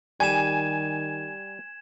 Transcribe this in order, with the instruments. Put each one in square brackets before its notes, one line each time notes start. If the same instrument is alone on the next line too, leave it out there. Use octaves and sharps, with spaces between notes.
[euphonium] D#3 [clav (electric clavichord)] G3 [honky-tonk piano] G#5 [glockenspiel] G#6 E7